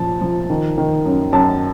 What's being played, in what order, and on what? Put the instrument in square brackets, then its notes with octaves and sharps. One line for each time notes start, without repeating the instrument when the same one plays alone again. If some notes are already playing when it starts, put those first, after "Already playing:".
Already playing: [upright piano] A#2 F3 A5
F3
D#3
D#3
F#2
F#2 A5